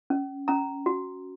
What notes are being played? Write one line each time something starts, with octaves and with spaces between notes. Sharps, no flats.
C#4
C#4 A#5
F#4